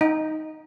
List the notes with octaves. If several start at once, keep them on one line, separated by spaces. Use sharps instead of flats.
D#4